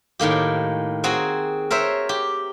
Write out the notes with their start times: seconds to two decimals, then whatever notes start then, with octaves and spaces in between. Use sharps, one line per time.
0.19 A2 D#3 A#3 G4
1.04 C4 F#4 G#4 G#5 A#5
1.71 A#4 C5 C#5 E5
2.09 G4